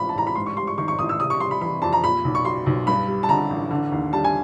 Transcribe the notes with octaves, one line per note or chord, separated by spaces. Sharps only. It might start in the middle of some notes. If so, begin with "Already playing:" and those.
Already playing: A1 G#2 F3 F5 B5
A5
A1 A#5
B5
G#2 C6
C#6
G3 C6
C#6
D#3 C#6
C#6
A1 D#6
E6
C3 D#6
C#6
G3 C6
B5
E3 B5
F2 A5
A#5
A#2 B5
B1
C#6
F#3 C6
B1
G2 B5
G3
A5
D3 A#5
A1
D3
D#2
G3 A5
G#5